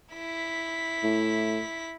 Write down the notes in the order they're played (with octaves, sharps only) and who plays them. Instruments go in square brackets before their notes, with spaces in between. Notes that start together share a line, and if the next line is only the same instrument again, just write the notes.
[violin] E4 B6
[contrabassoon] A2